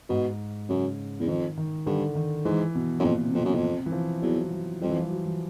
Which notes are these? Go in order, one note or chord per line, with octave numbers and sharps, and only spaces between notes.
G#2 B2
F#2 C#3
E2
F2 D#3
D#3
G2 D3
D#3
G#2 E3
B2
F#2
F2 A#2
C3
F2 B2
F#2
F2 B2
C3
E3
F3
E2 F#3
F#3
F2 G3
E3
F3
F#3
E3